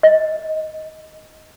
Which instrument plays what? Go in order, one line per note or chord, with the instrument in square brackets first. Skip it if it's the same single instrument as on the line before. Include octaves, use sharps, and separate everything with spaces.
[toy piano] D#5